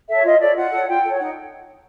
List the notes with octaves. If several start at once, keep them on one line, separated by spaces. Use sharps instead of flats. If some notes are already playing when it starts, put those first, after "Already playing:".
A4 C#5 E5
F4 D#5
A4 C#5 D5
F4 F#5
A4 C#5
F4 G5
A4 C#5
G5
D#4 F#5